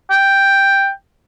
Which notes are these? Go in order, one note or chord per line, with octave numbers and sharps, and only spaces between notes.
G5